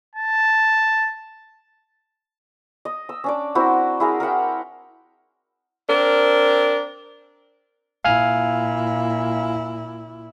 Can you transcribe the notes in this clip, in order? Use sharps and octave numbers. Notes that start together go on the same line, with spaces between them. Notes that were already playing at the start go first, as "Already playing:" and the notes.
A5
D#5
E6
C#4 D4 D5
C4 E4 F#4 A#4
E4 G#4 A#4
A#4 E5 F#5 G5
C4 D4 A#4
A#2 E4 F5 G#5 F6